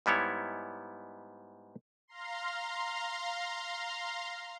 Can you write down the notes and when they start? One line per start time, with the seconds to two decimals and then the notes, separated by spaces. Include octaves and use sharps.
0.06 G#2 G3 B3 E4 C#5
2.08 F5 A#5 C6